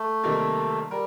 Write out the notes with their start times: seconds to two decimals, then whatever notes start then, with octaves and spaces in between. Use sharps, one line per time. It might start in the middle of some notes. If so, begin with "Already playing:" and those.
Already playing: A3
0.24 C3 D#3 G3 A#3
0.91 G3 A#4